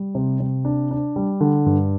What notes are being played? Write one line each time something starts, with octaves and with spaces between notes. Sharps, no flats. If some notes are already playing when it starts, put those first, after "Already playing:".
Already playing: G3
C3
C3
D4
D4
G3
D3
G2